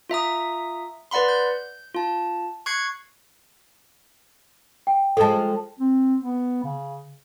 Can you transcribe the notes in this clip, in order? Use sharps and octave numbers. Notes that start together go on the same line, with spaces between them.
F4 E5 A#5 D#6
B4 D5 F#5 B5 C6
G6
F4 A5
C#6 F#6 G#6 C7 C#7
G5
F3 G#3 A4 A5
C4
B3
C#3